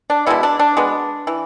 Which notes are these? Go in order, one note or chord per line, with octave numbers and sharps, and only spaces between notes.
D4
B2 G#3 B3 E4
D4
D4
B2 G#3 B3
E3